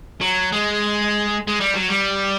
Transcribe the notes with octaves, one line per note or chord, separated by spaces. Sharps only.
F#3
G#3
G#3
G3
F#3
G3